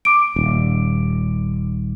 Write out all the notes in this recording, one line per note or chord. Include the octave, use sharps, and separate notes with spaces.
D6 D7
D#1